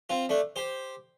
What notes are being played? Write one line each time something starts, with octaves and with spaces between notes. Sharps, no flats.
C4 F4
A3 D4
G4 C5